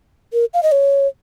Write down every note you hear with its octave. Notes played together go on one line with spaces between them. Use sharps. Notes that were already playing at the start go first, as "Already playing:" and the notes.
A#4
F5
D#5
C#5